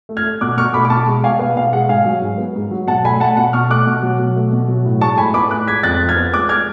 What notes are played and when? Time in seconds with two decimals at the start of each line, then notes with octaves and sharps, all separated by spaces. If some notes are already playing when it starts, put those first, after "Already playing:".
0.09 A3
0.17 F6 G#6
0.25 A3
0.41 B2 D6 F#6
0.57 B2 C#6 F6
0.74 A3 B5 D6
0.85 D6
0.90 B2 A5 C#6
1.07 G#3
1.24 B2 F5 G#5
1.39 B3 F5
1.56 B2 F5
1.73 G#3 F#5
1.89 G#2 F5 G#5
2.05 F#3
2.22 G#2
2.38 B3
2.56 G#2
2.71 F#3
2.87 B2 F#5 A5
3.05 A3 G#5 B5
3.20 A3 F#5 A5
3.37 B2 F#5
3.53 B2 C#6 F6
3.70 A3 D6 F#6
3.87 B2
4.03 F#3
4.19 B2
4.36 A3
4.53 B2
4.68 F#3
4.85 A2
5.01 G#3 A5 C#6
5.18 A2 G#5 B5
5.34 B3 B5 D6
5.51 A2 D6 F#6
5.67 G#3 G#6 B6
5.83 F2 F#6 A6
6.01 F3
6.09 F6 G#6
6.17 B3
6.34 G#3 D6 F#6
6.49 F6 G#6